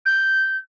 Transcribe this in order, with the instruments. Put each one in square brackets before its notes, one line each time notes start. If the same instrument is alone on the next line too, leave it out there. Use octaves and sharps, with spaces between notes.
[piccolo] G6